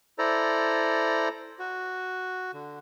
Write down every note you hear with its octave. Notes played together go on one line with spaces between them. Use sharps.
E4 A4 C5 D5 A#5
F#4
D3